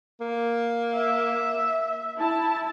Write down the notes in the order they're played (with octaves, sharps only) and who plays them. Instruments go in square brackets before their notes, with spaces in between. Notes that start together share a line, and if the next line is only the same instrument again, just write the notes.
[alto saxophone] A#3
[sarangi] E5
[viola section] E4 A5